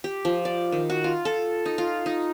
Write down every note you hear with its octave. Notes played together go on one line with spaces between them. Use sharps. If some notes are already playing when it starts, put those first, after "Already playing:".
G4
F3
D5
D#3
F#4
F4
A4
D#4
F4
D#4